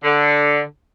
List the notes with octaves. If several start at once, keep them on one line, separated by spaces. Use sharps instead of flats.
D3